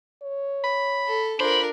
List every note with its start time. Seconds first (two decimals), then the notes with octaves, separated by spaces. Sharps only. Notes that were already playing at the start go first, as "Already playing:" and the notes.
0.22 C#5
0.64 B5
1.07 A4
1.40 D4 F4 A#4 C5 B5